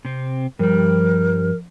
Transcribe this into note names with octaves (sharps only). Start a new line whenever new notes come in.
C3 C4
G2 F3 G3 A#4